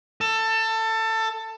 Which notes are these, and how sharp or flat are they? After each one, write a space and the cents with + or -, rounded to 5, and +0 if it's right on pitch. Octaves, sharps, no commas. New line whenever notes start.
A4 +20